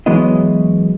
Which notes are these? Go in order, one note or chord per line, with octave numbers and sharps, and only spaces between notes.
E3 F#3 G#3 B3 E4 D#5